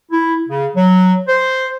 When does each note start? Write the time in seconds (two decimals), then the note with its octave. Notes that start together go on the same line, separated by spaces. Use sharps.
0.11 E4
0.48 C#3
0.76 F#3
1.28 C5